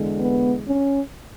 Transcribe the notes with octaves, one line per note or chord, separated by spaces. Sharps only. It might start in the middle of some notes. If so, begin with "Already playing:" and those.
Already playing: E2 D3 G#3
B3
C#4